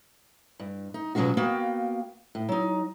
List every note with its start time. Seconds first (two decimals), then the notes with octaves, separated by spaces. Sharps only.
0.60 G2
0.94 D#4
1.15 B2 F3 F#3 G#3 C#4 F#4
1.37 A#3 B3 F#4 F5 G5
2.35 A2
2.49 F#3 D#4